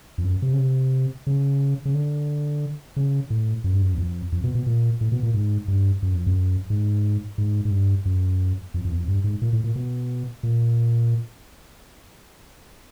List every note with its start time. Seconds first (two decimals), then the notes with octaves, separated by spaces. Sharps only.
0.18 F2
0.25 F#2
0.42 C3
0.53 C#3
0.59 C3
1.27 C#3
1.85 C#3
1.94 D3
2.96 C#3
3.30 A2
3.64 F#2
3.73 G2
3.82 F#2
3.94 E2
3.98 F2
4.32 F2
4.44 B2
4.55 B2
4.66 A#2
5.01 A2
5.12 B2
5.23 A#2
5.34 G#2
5.68 G2
6.02 F#2
6.15 F2
6.27 F#2
6.70 G#2
7.38 G#2
7.65 G#2
7.71 G2
8.05 F#2
8.74 F2
8.85 F2
8.91 E2
8.96 F2
9.08 G2
9.24 G#2
9.42 A#2
9.53 A2
9.64 A#2
9.76 B2
10.43 A#2